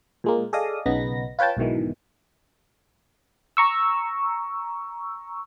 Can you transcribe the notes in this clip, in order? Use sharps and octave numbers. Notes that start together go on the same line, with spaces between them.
A#2 G#3 A#3
G#4 A4 D5 D#5 F5 D#6
B1 C#3 B3 D#4 B5 A#6
F4 B4 C#5 G5 A5
B1 G#2 B2 D#3 E3
A#5 C#6 E6